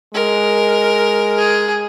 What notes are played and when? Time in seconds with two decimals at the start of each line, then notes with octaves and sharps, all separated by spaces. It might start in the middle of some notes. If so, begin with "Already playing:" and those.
0.15 G#3 A#4
1.38 G#4